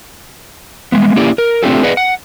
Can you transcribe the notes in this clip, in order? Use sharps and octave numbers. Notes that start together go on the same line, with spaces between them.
G3 G#3 B3
A#3 C#4 E4 G4 D5
A#4
A3 C4 D4 F4 G4 A4
B3 G#4 B4 D5 D#5 F#5
F#5